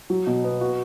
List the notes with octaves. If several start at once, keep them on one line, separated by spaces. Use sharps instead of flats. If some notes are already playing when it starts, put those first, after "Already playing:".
F#3
B2
B3
F#4